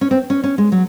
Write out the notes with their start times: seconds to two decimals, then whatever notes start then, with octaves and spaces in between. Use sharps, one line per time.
0.01 C#4
0.11 C4
0.30 C#4
0.44 C#4
0.58 G#3
0.72 F#3